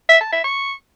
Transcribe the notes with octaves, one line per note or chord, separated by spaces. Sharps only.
E5
A5
E5
C#6